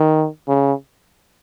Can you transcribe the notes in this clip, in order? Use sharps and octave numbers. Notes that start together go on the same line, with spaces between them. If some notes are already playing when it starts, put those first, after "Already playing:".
Already playing: D#3
C#3